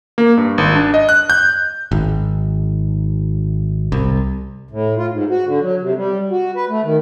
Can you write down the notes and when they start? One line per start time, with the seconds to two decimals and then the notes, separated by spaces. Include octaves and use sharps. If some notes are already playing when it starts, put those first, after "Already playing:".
0.18 A#3
0.37 G2
0.58 G#1
0.76 D4
0.94 D#5
1.09 F#6
1.30 G6
1.91 G#1
3.92 C2
4.69 A2
4.97 F4
5.10 G#2
5.30 F#4
5.46 D3
5.61 F#3
5.82 C3
5.96 G3
6.31 F#4
6.56 B4
6.69 A3
6.83 D#3